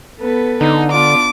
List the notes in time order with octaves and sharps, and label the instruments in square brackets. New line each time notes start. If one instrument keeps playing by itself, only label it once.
[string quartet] B3 A4 B4
[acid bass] D3 [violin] D#4
[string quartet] B3 D4 F4 [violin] D6